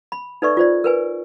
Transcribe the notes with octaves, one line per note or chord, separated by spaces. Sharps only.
B5
D#4 A4 B4 D5 E5 C#6
F4 C5 D5
A#4 B4 G#5